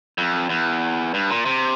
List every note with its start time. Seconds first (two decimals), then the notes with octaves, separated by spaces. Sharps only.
0.18 F2
0.49 E2
1.14 G2
1.30 A#2
1.46 C3